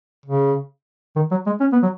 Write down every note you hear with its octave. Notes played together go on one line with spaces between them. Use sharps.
C#3
D#3
F#3
G#3
C#4
B3
F#3